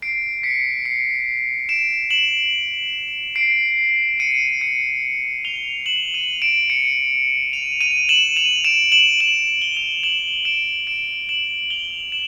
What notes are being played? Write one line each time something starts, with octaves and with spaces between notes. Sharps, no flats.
C7 D7
B6 C#7
C7 D7
D7 E7
E7 F#7
C7 D7
C#7 D#7
C#7 D#7
F7 G7
E7 F#7
D#7 F7
D7 E7
C#7 D#7
D#7 F7
D#7 F7
E7 F#7
D#7 F7
D7 E7
E7 F#7
E7 F#7
G7
F7 G7
E7 F#7
D7 E7
D7 E7
E7 F#7
F7 G7
E7 F#7